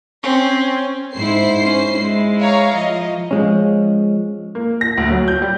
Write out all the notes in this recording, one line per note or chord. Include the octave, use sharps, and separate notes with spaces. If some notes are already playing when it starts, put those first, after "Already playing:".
C4 C#4
G#2 E4 C5 C7
C#4
G#3 E4
C#5 F5 A#5
F3 D#5
F3 G#3 C#4
A#3
A#6
D2
F#3
G6
G3